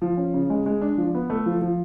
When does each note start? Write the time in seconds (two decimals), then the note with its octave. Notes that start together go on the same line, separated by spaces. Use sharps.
0.02 F3
0.17 C#4
0.34 C#3
0.50 G#3
0.66 G#3
0.82 D4
0.98 F3
1.15 B3
1.30 A3
1.46 F3
1.62 F3